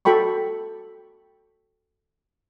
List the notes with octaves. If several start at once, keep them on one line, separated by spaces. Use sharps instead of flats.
F#4 A4 G5 B5 C#6